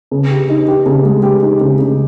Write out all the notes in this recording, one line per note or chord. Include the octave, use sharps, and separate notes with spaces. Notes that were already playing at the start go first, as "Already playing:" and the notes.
C#3
G4
D#4
G4
C#3
G#3
G4
D#4
C#3
C#3